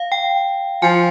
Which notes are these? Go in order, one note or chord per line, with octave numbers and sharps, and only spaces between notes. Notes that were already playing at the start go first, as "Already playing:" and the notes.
Already playing: F5
G5
F3 G#5